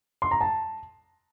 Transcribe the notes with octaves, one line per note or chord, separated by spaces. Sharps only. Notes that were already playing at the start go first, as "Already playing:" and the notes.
C6
A#5
A5